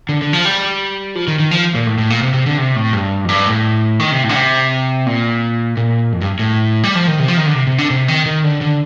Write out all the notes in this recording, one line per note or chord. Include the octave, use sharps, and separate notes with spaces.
D3
D3
F3
G3
F3
D#3
D#3
F3
A#2
A2
A2
A#2
C3
C3
D3
C3
A2
G2
F2
G2
A2
D#3
C3
A2
D3
C3
A#2
A#2
F2
G2
A2
G3
F3
D#3
C3
F3
D#3
D3
C3
C3
D3
C3
D#3
D#3
D3
D3